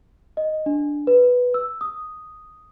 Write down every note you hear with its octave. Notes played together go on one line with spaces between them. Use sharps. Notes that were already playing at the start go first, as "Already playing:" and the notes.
D#5
D4
B4
E6
D#6